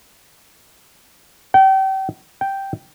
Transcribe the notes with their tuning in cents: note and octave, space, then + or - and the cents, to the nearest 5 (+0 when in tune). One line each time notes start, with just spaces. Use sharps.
G5 -35
G5 -5